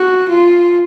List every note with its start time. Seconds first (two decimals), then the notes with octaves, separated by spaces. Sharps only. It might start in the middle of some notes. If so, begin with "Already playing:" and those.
Already playing: F#4
0.29 F4